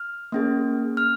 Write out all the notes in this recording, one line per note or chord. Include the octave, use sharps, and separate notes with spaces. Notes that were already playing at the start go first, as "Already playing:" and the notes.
Already playing: F6
A#3 C#4 G#4
F6